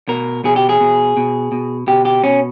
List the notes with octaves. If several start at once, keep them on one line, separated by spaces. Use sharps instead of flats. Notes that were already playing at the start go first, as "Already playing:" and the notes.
B2 A#4
B2 G#4
G4
G#4
B2
B2
B2
B2 G4
G4
B2 C#4